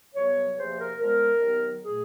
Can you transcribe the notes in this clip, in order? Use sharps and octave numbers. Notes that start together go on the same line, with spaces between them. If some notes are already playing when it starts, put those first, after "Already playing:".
C2 B2 F#3 B3 C#5
E2 C3 F3 A#3 C5
A#4
A#2 F3 G#3 B3 A#4
D#2 D#3 F#3 B3
A#2 F#3 A3 G#4